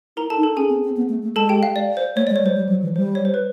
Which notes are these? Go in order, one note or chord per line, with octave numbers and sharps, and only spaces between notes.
E4 A#4 A#5
A4 A5
D#4
A4 A5
C#4 G#4 G#5
C4
C4
B3
A3
A3
G#3 A4 A5
G4 G5
F5
D5
C5
A3 C#5
G#3 D5
C#5
G3
C5
G3
F#3
E3
G3 C5
C#5
C5
B4